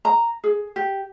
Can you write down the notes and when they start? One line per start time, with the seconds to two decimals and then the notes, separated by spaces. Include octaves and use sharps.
0.05 A#5
0.44 G#4
0.76 G4